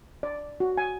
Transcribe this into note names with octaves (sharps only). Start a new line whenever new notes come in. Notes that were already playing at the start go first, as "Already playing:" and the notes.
D5
F#4
G#5